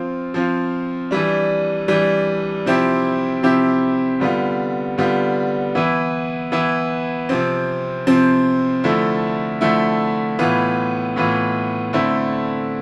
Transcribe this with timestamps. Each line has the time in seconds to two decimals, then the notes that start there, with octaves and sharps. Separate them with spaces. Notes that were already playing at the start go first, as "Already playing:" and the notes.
Already playing: F3 C4 F4
0.34 F3 C4 F4
1.11 E3 G3 D4
1.88 E3 G3 D4
2.66 C3 F3 C4 E4 G4
3.43 C3 F3 C4 E4 G4
4.20 D3 G3 B3 F4
4.98 D3 G3 B3 F4
5.75 E3 B3 E4
6.52 E3 B3 E4
7.29 C3 F3 C4
8.07 C3 F3 C4
8.84 D3 F3 A3 E4
9.61 D3 F3 A3 E4
10.39 A2 E3 B3 F4
11.16 A2 E3 B3 F4
11.93 D3 A3 C4 E4